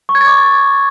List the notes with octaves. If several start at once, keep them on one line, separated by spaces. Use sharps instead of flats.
C#6
G#6
A6
D6